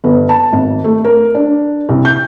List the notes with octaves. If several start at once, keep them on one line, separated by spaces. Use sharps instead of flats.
G1
A5
G#1
A3
A#4
D4
C2
G6